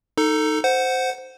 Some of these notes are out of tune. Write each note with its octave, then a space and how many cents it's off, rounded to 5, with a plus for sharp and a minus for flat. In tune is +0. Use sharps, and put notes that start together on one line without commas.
D#4 +0 A4 +15
C5 -10 F#5 +0